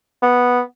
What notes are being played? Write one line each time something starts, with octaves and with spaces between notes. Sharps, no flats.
B3